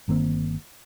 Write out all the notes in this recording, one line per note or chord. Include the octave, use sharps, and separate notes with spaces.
G1 D#3 A#3 C4